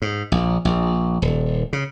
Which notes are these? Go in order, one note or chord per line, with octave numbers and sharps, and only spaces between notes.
G#2
A#1
A#1
D#1
C#3